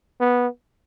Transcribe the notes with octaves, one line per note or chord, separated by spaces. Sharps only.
B3